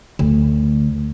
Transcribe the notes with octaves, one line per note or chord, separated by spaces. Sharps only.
D2